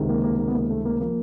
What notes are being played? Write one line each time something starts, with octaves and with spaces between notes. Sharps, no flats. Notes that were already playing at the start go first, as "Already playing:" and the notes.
Already playing: C#2 C3 D#3
A#3
A#3
A#3
B3
A#3
A3
A#3
F3 A#3